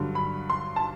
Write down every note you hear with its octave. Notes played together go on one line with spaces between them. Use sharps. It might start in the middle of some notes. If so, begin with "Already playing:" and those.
Already playing: G2 D3 F#3
B5
C6
A5